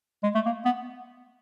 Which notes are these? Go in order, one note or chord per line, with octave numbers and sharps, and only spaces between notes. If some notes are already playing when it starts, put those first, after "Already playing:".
G#3
A3
A#3
B3